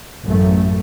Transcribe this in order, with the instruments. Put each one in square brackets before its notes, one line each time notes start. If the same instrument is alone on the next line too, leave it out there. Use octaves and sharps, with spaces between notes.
[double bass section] A1 F#2 A3